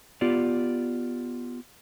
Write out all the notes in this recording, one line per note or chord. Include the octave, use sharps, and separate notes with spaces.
B3 F4 G4 D5